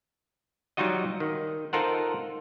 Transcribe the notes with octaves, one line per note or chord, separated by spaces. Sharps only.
F#3 G3 D#4 F4 F#4 D#5
D#3
D#4 F4 A4 A#4 C5 F#5